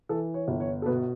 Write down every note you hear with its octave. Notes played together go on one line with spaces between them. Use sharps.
E3 A4
C#5
G1
C#5
A4
B2 B4